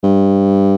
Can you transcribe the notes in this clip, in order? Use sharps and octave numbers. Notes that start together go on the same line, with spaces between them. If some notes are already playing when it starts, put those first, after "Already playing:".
G2